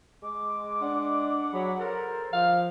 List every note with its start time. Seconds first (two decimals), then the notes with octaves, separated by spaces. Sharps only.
0.23 G#3 D6
0.82 D4 F#5
1.53 F#3 G#4 B5 D6
1.80 C#3 A4 A#4 C5
2.33 F3 F5